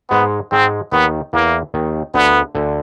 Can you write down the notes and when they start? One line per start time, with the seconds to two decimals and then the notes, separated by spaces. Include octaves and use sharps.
0.11 G#2 G#3 B3
0.52 G#2 G#3 C4
0.92 D#2 D#3 B3
1.33 E2 E3 A#3
1.74 D#2 D#3
2.14 D2 D3 B3
2.55 D2 D3